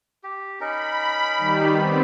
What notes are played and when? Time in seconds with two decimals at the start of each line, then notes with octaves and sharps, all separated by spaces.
0.23 G4
0.60 C#4 D#4 A#4 B5
1.38 D#3 G3 G4
1.73 B3 C4